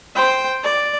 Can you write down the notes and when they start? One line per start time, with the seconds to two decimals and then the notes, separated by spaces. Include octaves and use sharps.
0.15 C5 G5
0.64 D5